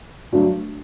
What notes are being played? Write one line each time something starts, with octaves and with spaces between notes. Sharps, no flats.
G2 F#3 A3 D4 F#4